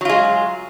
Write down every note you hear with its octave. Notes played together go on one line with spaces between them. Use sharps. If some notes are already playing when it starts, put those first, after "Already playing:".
F#3 G#3 F4